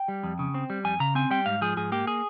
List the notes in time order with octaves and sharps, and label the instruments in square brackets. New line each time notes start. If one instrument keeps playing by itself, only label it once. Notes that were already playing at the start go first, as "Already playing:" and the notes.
Already playing: [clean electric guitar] G5
G3
F2
C#3
C4
G3
F2 G#5
C#3 A#5
C4 G#5
G3 G5
G#2 F5
F3 G#4
G#2 G#4
A#3 G4
G#4